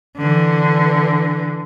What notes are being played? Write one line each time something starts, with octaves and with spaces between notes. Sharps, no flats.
D3 E3